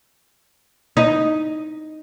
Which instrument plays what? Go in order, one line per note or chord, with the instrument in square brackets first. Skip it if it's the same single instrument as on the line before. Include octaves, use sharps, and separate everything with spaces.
[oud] D#4